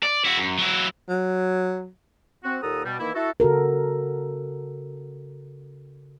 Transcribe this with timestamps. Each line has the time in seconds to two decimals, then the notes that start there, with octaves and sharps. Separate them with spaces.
0.03 D5
0.25 E4 F#4
0.37 F#2
0.59 F#3 E4
1.09 F#3
2.44 C4 F#4
2.63 D#2 A#2 A4 F#5 A#5 D#6
2.86 B2 G3
3.00 D#3 E3 A#3 E4
3.15 E4 F#4 A4
3.40 C#3 F#4 A4 A#4